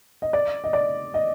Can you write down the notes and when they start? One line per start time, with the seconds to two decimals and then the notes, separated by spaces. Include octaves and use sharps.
0.22 D#5
0.33 D5
0.64 D#5
0.73 D5
1.14 D#5